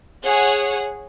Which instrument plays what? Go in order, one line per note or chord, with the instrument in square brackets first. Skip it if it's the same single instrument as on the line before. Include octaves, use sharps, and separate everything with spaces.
[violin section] G#4 C#5 F#5